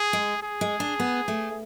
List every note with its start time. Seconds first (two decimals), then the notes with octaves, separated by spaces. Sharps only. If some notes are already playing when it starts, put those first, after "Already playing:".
Already playing: G#4
0.13 G#3
0.43 G#4
0.61 G#3
0.80 D4
1.00 B3
1.28 A3